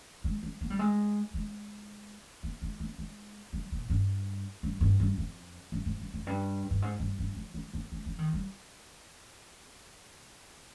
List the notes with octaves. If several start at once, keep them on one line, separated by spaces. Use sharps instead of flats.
G#3
G#3
A#3
G3
G#3
G#3
A#3
G#3
A#3
G#3
G3
A#2
G2
G2
G2
G2
F2
G2
G#2
G2
F2
G2
G2
G#2
G2
G2
F3
G#3
A#3
G#3
F3
D#3
G3